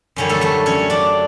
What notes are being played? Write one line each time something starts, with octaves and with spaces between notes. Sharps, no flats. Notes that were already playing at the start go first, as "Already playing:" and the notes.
F#2 D3 G3 C#4 C#5
A3 A4
A3 A4
C#4 C#5
D4 D5